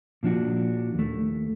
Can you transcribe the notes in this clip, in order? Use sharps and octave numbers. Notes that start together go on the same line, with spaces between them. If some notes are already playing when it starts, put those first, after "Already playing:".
A#2 F3 D4 F#4
D#2 A3